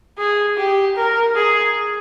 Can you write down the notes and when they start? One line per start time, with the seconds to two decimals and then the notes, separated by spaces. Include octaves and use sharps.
0.18 G#4
0.57 G4
0.96 A#4
1.35 G#4